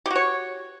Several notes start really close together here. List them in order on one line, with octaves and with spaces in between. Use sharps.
G4 F#4 C#5